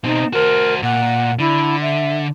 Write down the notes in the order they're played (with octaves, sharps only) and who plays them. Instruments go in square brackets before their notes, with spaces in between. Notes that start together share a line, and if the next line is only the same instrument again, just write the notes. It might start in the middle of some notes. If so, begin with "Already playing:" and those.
[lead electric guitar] B2 C4 [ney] D#4
[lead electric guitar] F#4 C5 [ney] A#4
[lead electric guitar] A#2 [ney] F#5
[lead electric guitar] D3 [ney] E4
[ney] E5